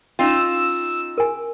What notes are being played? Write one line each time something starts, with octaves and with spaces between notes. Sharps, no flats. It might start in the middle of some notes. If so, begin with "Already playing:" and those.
C#4 D#4 F4 E6
A#4 G#5